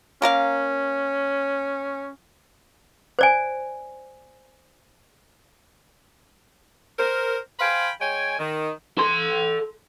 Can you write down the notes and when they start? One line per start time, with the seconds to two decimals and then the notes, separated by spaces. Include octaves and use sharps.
0.22 A#3 C#4 A#4 F5
3.19 C5 D5 G#5
6.99 A#4 C5
7.60 C5 F5 G5 G#5 B5
8.00 G#3 C#5 G5 G#5
8.39 D#3
8.98 A4 C6